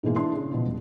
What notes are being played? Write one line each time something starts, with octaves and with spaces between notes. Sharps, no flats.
G#2 B2 E3 G#3 A#3
E3 D4 C6
C#3
B2 F3
D#1